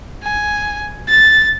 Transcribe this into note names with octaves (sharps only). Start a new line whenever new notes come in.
G#5
A6